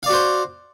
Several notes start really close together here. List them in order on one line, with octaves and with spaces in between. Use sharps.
F5 D5 F#4 C5